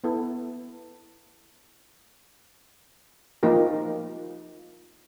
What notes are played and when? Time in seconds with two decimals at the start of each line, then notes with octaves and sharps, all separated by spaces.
0.04 B3 E4 A4
3.43 F3 A#3 D#4 G4 A#4